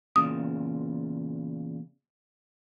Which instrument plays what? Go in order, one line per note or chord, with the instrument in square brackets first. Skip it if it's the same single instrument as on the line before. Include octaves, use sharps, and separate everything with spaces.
[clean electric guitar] E2 A#2 C#3 [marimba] D#6